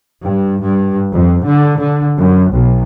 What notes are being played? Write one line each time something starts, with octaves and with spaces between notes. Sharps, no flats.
G2
G2
F2
D3
D3
F#2
B1